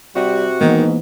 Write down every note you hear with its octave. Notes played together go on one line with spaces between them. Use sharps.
C3 G3 F#4
G#2 D#3 E3 A#3 B3